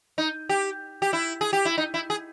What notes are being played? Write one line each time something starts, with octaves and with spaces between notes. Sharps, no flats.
D#4
G4
G4
E4
G#4
G4
E4
D#4
E4
G#4